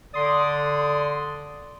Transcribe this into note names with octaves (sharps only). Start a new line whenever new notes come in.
D3 D5 C6 D#6